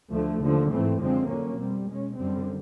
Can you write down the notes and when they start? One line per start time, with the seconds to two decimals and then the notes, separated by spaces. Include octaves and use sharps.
0.11 D2 D3 F3 A3
0.40 D#2 D3 F3
0.69 G#2 E3 A3 C4
0.99 F#2 D3 F3 G#3 C4
1.28 F2 D3 F#3 A#3 C#4
1.57 B2 G3 C4
1.87 B2 G#3 C#4
2.16 F#2 D3 G3 C4